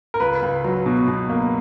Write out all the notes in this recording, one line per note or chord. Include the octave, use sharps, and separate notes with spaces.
A#4
C#2 B4
C#2
F#3
B2
B2
A#3